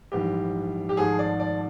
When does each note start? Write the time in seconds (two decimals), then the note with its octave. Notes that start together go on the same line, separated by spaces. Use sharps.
0.12 A#1 G#2 E3 G3 G4
0.89 G4
0.97 G#1 G#2 F3 A3 G#4
1.19 D5
1.40 D5